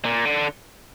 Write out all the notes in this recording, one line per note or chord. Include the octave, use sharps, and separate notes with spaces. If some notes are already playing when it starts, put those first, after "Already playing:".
A#2
D3